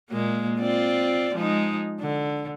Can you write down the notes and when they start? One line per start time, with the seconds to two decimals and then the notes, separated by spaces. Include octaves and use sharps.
0.10 A#2 G#3 A#3
0.59 C4 F4 D5
1.35 F3 G#3 D#4
2.00 D3